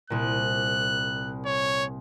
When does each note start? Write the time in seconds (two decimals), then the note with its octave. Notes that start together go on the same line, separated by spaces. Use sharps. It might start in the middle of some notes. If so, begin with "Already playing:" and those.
0.10 C2 A#2 F#6
1.46 C#5